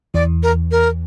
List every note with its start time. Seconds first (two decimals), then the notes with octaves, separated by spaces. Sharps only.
0.14 E2 E3 D5
0.43 A#4
0.71 A#4